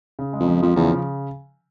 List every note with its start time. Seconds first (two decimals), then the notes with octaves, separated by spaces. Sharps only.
0.19 C#3
0.33 G#3
0.40 F2
0.47 F3
0.62 F2 F3
0.76 E2 C#3
0.91 C#3